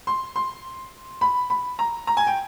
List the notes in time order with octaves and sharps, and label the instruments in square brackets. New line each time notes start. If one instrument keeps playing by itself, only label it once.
[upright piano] C6
C6
B5
B5
A#5
A#5
G#5
G5